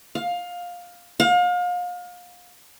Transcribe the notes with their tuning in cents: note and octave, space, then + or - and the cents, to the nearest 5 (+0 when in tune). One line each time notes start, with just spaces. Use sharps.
F5 +15
F5 +35